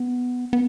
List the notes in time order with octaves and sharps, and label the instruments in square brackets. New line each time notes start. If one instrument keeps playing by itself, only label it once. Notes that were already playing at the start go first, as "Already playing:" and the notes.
Already playing: [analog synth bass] B3
B3